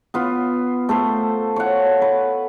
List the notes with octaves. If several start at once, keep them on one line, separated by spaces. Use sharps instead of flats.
B3 F4
A3 A4 C5
C#5 F#5
B4